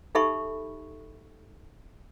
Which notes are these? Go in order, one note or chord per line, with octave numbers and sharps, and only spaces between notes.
D#4 G4 A4 E5 B5 C#6